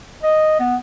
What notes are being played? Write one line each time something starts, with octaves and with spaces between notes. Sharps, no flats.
D#5
B3